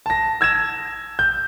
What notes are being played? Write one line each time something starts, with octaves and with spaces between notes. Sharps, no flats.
A5 A#6
E6 G#6 A#6 E7
G6